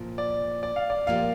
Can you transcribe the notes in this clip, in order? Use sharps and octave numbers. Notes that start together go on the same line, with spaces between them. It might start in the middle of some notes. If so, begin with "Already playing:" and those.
Already playing: A#2 F3
D5
D5
F5
D5
A#2 F3 A#3 G4 D5 F5